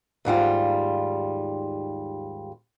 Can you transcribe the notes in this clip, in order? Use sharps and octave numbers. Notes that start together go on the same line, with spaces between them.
D#2 G#2 G3 F4